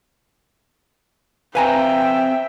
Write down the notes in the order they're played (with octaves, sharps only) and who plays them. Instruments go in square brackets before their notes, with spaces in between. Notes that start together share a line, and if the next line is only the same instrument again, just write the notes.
[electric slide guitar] C4 C5 F5 [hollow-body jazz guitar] B4 G#5 A#5 [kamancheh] E5 G5